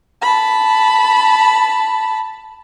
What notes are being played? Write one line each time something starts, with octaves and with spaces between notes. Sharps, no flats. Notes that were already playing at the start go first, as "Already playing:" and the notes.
A5 B5